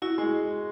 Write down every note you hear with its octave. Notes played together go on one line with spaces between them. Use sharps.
E4 F#4
G#3